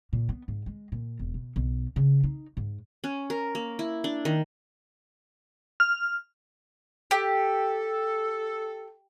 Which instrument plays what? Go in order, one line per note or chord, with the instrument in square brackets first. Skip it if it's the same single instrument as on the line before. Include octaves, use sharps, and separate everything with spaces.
[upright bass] A#2
B3
G#2
G#3
A#2
E1
B2
B1
C#3
D#4
G#2
[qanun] C#4
A#4
A#3
E4
D4
D#3
[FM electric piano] F6
[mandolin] G4 [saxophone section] A4